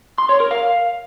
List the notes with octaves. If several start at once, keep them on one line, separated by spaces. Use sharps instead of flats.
C6
C#5
A#4
F5